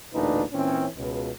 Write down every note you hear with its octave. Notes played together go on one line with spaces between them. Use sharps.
A1 D2 A#2 D4 D#4 B4
A#2 E3 C4 C#4
C#2 B2